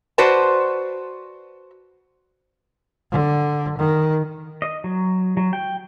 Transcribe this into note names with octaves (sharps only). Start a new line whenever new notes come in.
F#4 B4 C5 D5 A5
D3
D#3
D#5
F#3
F#3
G5